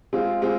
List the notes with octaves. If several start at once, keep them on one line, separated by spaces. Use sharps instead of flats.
G#3 C4 F4
G#3 C4 F4